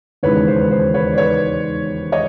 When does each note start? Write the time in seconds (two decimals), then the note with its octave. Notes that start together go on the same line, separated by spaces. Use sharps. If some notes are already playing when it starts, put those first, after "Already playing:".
0.23 E1 D#2 C#3 E3 G#3 B4 C#5
0.47 C5
0.61 B4
0.71 C5
0.94 B4 C#5
1.13 D5
1.18 B4 C#5
2.12 C#5 D#5